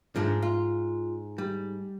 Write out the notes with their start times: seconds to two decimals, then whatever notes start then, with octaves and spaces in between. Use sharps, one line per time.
0.16 G#2 F3 G#3 D4
0.42 F4
1.38 G3